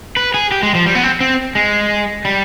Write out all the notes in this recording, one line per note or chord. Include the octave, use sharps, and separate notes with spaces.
B4
G#4
G4
G#3
F3
G3
B3
C4
C4
G#3
G3